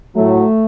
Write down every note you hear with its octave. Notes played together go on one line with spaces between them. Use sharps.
A2 F#3 A3